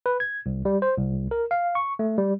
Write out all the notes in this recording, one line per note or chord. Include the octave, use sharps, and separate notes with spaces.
B4
G#6
C2
G3
C5
C2
A#4
F5
C#6
A3
G3